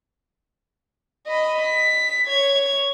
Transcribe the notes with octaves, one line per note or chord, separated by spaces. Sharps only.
D#5 B5
B6
C#5 G#6